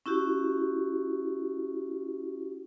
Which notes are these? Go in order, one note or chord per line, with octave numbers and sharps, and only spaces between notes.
C#4 E4 F#4 G4